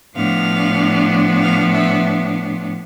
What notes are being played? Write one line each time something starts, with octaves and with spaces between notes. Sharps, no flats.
A2 F3 B3 D4 F5
F5
E5